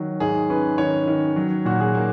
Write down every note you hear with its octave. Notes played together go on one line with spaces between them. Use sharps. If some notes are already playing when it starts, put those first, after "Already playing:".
Already playing: D#3 F#3
G#2 G#4
C#4 B4
D#3 C#5
D#3
F#3
A#2 F#4
G#4
A#3 A#4